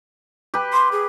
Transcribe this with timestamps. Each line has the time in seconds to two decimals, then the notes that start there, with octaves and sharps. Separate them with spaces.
0.54 G4 B4
0.73 C6
0.92 G#4